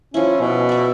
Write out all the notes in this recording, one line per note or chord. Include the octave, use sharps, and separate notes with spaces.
F3 C#4 E4
B2
D5 E5